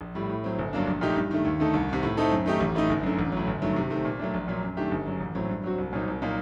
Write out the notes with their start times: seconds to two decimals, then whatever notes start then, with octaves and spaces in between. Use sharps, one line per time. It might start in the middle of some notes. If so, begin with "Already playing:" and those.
0.01 A#1
0.15 A2 G3
0.30 A2
0.44 F#3 C4
0.59 G1
0.73 G2 F#3 A#3 D4
0.87 A#1
1.01 A#2 A3 D#4 G4
1.16 G2
1.31 D#3 A3
1.45 D#2
1.60 D3 A3 D#4 A4
1.73 C2
1.89 C3 D#3
2.03 A2
2.17 A3 C4 D#4 A4
2.32 F#2
2.46 D#3 A3 D#4 G4
2.60 A1
2.75 A2 A3 D#4
2.89 G1
3.03 F#2 D3
3.18 A1
3.32 A2 F#3
3.47 G1
3.62 G2 D#3 F#3 A3
3.76 C3
3.90 D#3 A3 C4
4.05 A#2
4.19 F#3 A3 D4
4.34 A#1
4.48 A#2 F#3
4.63 F#2
4.77 D#3 A3 D4 G4
4.91 G1
5.06 F#2 F#3
5.20 A1
5.35 A2 F#3 C4
5.49 G2
5.64 F#3 C4 F#4
5.78 C2
5.93 A#2 F#3 C4 D#4
6.07 C2
6.22 A#2 F#3 A#3 D#4